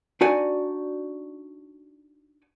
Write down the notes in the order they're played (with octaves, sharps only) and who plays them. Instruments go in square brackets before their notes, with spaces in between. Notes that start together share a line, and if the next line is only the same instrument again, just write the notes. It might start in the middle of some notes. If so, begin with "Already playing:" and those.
[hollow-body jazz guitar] D4 D#4 F#4 D5 G#5